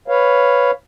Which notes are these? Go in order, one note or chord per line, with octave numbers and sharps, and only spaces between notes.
B4 C#5 F5